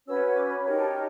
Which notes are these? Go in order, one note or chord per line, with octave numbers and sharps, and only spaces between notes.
C#4 F#4 B4 E6
D6
B5
D#4 G4 A#4 C#5 A#5
A5